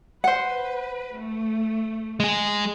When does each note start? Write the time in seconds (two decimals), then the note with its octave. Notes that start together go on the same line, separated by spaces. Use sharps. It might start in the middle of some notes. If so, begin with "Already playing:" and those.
0.24 B4 C5 F#5
1.18 A3
2.20 G#3 G#4